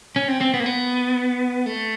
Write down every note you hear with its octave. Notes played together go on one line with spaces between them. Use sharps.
C#4
C4
C4
B3
A#3
B3
A3